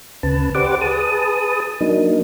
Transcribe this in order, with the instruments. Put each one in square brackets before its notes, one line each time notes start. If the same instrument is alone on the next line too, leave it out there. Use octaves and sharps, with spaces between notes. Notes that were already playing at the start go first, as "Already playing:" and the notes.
[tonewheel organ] D2 C#3 B4 A5
G4 B4 C5 D5 F#5 D6
G#4 B4 A5 D#6
F#3 A#3 D4 D#4